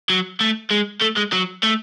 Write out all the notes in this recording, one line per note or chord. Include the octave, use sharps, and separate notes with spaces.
F#3
A3
G#3
A3
G#3
F#3
A3